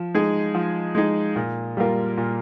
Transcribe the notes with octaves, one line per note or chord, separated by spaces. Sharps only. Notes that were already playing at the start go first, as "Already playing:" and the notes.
Already playing: F3
G#3 D#4 G#4
F3
G#3 D#4 G#4
A#2
G3 A#3 F4 A#4
A#2